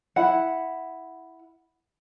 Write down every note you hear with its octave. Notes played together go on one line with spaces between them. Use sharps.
E4 F#5